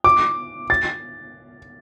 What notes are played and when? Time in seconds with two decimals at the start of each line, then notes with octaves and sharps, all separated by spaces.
0.04 D6
0.70 A6